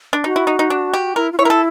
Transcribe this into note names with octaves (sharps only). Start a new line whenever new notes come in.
D4
D#4 F#4
E4
D#4
D#4
D4
G4
E4 A#4
F4
E4 C#5
A#4
A4